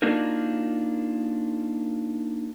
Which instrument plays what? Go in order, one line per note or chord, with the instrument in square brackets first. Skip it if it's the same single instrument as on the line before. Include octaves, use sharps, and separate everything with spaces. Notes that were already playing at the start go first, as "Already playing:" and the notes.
[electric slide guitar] A#3 D4 D#4 F4 F#4 A#4